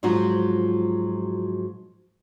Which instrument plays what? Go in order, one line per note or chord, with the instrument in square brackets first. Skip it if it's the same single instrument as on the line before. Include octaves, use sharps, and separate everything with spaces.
[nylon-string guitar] G#2 F3 F#3 F4 F#4